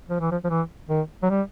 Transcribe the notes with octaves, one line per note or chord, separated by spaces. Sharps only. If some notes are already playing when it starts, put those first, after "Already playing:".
F3
E3
F3
F3
E3
D#3
F#3
G3